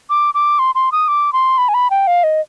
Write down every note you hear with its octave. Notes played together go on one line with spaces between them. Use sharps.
D6
D6
C6
C6
D#6
D6
C6
B5
G#5
B5
G5
F5
D#5